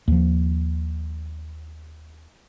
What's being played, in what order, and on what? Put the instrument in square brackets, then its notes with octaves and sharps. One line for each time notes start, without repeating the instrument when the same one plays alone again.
[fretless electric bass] D#2 F3